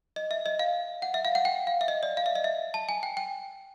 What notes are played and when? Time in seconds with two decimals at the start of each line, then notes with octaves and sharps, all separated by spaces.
0.16 D#5
0.31 E5
0.46 D#5
0.59 F5
1.02 F#5
1.14 E5
1.25 F5
1.35 F#5
1.45 G5
1.67 F5
1.81 E5
1.88 D#5
2.03 D5
2.17 F5
2.26 E5
2.35 D#5
2.44 E5
2.74 A5
2.89 G#5
3.03 G5
3.17 G5